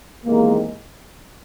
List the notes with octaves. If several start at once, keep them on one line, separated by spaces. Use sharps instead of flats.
E2 C3 D#3 G#3 A#3